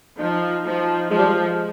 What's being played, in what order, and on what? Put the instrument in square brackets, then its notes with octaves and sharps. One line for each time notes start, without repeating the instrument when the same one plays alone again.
[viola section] F3 [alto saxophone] D#4
[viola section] F3
[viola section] F3 [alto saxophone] G#3
[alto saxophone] G3
G#3